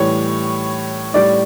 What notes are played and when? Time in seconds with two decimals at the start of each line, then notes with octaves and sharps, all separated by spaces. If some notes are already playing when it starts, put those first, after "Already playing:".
Already playing: A2 E3 G3 C#5
1.14 A2 G3 D5